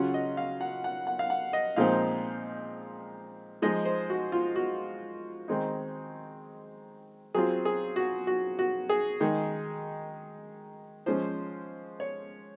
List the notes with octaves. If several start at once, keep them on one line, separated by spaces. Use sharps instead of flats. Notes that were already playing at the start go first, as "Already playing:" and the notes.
Already playing: C#3 F#3 C#4 F4 F#5
D#5
F5
F#5
F#5
F#5
F5
F#5
D#5
A#2 F3 G#3 C4 D#4 F5
F3 G#3 D#4 D#5
C5
F#4
F4
F#4
D#3 G#3 C4 D#4
F#3 C4 F4 G#4
G#4
F#4
F#4
F#4
G#4
D#3 G#3 D#4
F3 G#3 C#4 C5
C#5